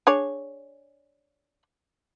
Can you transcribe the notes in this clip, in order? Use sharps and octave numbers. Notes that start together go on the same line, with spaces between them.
D4 G#4 C#5